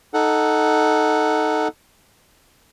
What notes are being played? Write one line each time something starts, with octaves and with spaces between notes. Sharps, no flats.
D#4 A4 F#5